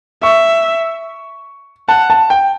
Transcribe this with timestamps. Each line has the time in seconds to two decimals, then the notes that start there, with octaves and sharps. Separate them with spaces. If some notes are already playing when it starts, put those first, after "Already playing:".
0.23 E5 C#6
1.89 F#5 A5
2.10 A5
2.30 G5